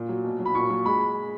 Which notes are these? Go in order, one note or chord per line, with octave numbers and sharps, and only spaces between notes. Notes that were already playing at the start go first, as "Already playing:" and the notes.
Already playing: A#2
F#3
B2
F#3
B5
A#2 C#6
F#3
G#3 B5